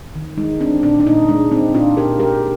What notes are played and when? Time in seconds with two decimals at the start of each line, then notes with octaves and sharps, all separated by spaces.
0.15 D#3
0.38 G#3 D#4
0.61 C4 D4
0.83 A#2 D4
1.00 D4
1.06 A#2 D#4
1.28 G#3 D4
1.51 C4 D#4
1.75 A#2 D4 F4
1.97 A#2 G4 A#4
2.20 G#3 G4 A#4